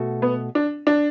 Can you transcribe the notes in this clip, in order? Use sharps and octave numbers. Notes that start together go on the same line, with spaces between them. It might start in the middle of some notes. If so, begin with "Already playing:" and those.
Already playing: B2 A3 F#4
B3
D4
D4